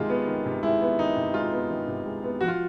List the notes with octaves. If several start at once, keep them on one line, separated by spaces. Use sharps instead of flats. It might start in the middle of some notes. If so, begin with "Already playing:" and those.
Already playing: C3 D#3 G#3 F4
B3
D#3
C3
G#3 E4
B3
D#3 D#4
C3
G#3 F4
B3
D#3
C3
G#3
B3
F3 F#4
F4